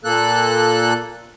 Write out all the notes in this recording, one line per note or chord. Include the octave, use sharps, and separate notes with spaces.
A#2 A#3 A4 F#6